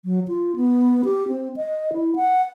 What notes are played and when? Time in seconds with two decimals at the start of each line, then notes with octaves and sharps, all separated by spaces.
0.05 F#3
0.28 F4
0.56 B3
1.05 G4
1.28 C4
1.56 D#5
1.93 E4
2.16 F#5